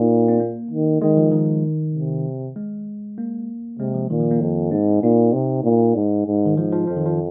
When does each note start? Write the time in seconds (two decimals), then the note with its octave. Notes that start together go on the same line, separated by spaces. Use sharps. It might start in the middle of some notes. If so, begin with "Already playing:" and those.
Already playing: A#2 D#4
0.28 C4
0.40 A#3
0.71 D#3
1.02 D#3 G#3
1.17 F3
1.32 D#3
1.94 C3
2.56 G#3
3.18 A#3
3.79 C3 G#3
3.94 F3
4.10 A#2 D#3
4.20 F3
4.31 A#3
4.41 F2
4.71 G#2 C4
5.03 A#2 D#4
5.33 C3
5.64 A#2
5.96 G#2
6.27 G#2
6.46 D#3
6.57 G#2 F3
6.73 F3
6.87 F2 F3
6.96 D#3
7.05 F3